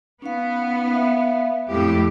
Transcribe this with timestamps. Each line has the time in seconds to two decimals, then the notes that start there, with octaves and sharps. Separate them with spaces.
0.22 B3 C#4 D#4 F5
0.91 E5 F5
1.70 F2 A2 E4 G4